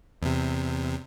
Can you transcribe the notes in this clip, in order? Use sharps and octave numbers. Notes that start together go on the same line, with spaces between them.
E2 C3